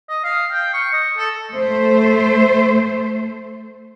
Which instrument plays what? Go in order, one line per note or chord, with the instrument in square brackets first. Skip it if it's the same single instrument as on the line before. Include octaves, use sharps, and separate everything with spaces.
[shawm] D#5
F5
G5
C#6
D#5
A4
[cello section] A3 C5